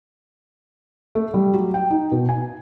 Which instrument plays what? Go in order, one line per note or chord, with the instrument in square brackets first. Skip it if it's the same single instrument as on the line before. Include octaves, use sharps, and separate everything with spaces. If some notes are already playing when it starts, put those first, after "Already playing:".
[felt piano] A3
G3
F#3
G5
D#4
B2
G#5